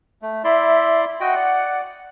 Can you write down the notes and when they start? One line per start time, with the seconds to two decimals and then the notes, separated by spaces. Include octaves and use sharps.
0.22 A3
0.44 E4 D5 E5 C6
1.20 F#4 D#5 F#5 G5
1.35 D5